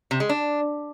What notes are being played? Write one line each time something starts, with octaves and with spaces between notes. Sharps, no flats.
C3
G#3
D4